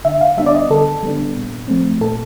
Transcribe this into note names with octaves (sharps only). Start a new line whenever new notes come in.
D3 E5
F5
G3 B3 D4 E5
D5
D#5
D3 A4
G3 B3 D4
A#2
F3 A3 C4
A#2 A4